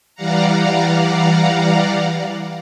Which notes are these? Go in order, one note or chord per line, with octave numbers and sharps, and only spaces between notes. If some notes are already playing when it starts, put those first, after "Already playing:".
E3 G3 D5 F5 F#5 A#5